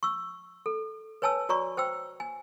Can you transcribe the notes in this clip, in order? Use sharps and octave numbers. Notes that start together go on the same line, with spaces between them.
C#6 E6
A4
B4 C#5 G#5 A5 E6
F#4 C#5 D5 A#5 C#6
C5 G5 E6
G#5